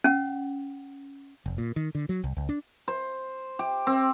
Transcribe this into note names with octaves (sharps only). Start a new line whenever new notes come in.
C#4 F#5
F1
A#2
D#3
D3
F#3
C2
C#2
D4
C5
G4
C4